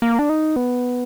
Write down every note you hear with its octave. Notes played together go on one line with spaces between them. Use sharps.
A#3
D4
D#4
B3